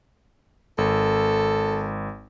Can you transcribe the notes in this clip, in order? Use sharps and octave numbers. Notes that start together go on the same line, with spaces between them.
G#1 A4